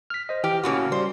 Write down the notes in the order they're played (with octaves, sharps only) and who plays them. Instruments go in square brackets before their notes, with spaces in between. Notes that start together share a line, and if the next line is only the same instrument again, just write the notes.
[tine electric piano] F6 B6
C5 D#5
[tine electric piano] E3 F6 [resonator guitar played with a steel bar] G4
[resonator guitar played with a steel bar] A2 C#3 A#3 [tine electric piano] C#4 F#4
[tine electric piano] G3 [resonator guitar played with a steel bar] C5